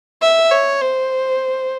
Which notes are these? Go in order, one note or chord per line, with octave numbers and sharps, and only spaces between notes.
E5
C#5
C5